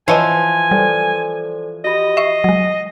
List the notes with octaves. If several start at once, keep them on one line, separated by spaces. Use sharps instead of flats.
E3 F3 C5 C#5 D#5 G#5
G3 A4 C5 D5
F#4 G4 D#5 B5
E5 C#6 C7
F#3 G#3